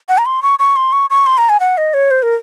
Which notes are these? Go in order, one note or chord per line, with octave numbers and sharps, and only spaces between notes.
F#5
A#5
C6
C#6
C#6
C6
C#6
C#6
C6
A#5
G#5
F#5
D#5
C#5
C5
A#4